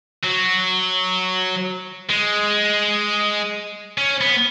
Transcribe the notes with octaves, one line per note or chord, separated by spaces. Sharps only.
F#3
G#3
C#4
B3